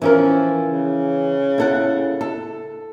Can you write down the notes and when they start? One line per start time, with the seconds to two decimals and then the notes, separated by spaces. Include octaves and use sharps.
0.02 E3 F3 C#4 A#4
0.71 C#3
1.58 E4 A4 F#5
2.21 A4